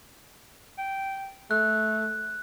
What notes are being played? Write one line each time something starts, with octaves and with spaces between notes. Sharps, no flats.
G5
A3 F#6